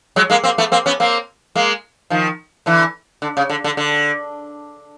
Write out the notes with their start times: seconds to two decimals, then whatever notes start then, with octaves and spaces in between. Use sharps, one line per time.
0.16 F#3 G#3
0.30 G#3 A#3
0.44 A#3 C4
0.58 A3 B3
0.72 A#3 C4
0.86 B3 C#4
1.00 A#3 C4
1.55 G#3 A#3
2.10 D#3 F3
2.66 D3 E3
3.22 D3
3.37 C#3
3.50 D3
3.64 D3
3.77 D3